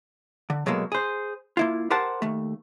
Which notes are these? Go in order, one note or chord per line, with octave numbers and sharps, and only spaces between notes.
D3
B2 F#3 G#3 A#3 A4
G#4 C5
A#3 E4 F4
G4 A#4 C5 F#5 A5
D#2 A3